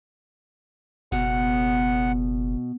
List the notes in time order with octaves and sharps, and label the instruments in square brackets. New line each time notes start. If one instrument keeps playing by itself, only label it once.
[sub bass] F#1 [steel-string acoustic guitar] B2 [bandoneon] F#5